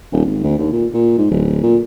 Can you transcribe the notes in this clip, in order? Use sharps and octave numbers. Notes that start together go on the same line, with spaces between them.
D#1
G#1
D2
D#2
A#2
A#2
G#2
D1
A#2